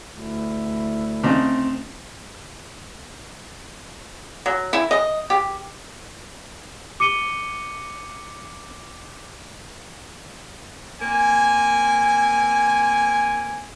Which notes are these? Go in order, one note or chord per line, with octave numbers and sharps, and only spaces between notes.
D2 E4
C#3 C4 D4 D#4
F#3
E4
D#5
G4
D6 C#7 D#7 G7
A#3 C4 G#5